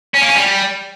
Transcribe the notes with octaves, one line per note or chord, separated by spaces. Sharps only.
C#4
A#3
C#4
G3